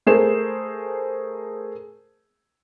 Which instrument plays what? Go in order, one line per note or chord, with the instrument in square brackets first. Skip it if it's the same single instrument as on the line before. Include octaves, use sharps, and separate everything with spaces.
[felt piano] A3 G#4 A#4 C5 E7